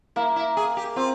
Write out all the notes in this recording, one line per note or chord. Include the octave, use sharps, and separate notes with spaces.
A#3 E4
E4
G#4
G4
C4 F4